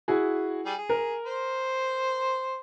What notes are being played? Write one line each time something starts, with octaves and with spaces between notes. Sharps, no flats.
E4 F#4 G#4
G3 G#4
G#4
A#4
C5